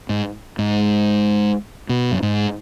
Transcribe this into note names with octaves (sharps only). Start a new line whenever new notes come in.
G#2
G#2
B2
F#2
G#2